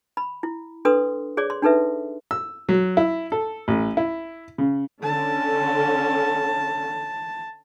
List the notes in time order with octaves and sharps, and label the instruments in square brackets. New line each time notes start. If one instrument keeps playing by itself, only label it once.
[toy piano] B5
E4
D4 A4 B4 C6 D#6
G#4 C#5 D5 D6
C6
D4 D#4 A4 B4 E5
[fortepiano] E6
F#3
E4
A4
A1
E4
C#3
[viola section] D3 C#4 [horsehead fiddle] A5